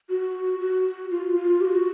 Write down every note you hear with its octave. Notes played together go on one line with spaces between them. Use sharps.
F#4
F#4
F4
F4
G4
F#4